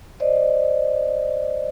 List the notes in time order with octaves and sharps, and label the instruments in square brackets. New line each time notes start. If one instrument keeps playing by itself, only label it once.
[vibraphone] C5 D5 D#5